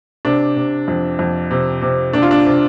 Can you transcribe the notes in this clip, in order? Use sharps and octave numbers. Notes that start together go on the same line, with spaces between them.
C3 D4
C3
F2
F2
C3
C3
C3 D4
F4
D4
C3